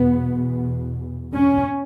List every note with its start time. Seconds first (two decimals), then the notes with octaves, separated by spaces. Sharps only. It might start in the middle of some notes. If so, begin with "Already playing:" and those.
Already playing: E2 B2 B3
1.34 C#4